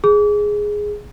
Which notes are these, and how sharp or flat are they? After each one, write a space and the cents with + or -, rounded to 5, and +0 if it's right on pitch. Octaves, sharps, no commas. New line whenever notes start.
G#4 +0